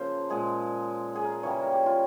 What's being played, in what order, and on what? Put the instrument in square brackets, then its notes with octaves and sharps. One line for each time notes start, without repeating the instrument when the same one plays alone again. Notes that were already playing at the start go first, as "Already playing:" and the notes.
Already playing: [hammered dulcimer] C#3 F3 A#3 C5
A#2 G#3 G#4
G#4
A#4
C#3 E3 G3 A#3 C#5
A#4
G4
F4